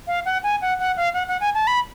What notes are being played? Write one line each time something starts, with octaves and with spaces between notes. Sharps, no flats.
F5
F#5
G#5
F#5
F#5
F5
F#5
F#5
G#5
A5
B5